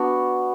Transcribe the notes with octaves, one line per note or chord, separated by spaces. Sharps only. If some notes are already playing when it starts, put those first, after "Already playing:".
Already playing: B3 D4 F#4